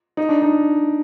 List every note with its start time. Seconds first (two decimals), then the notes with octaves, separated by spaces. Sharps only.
0.17 D#4
0.29 D4
0.42 D#4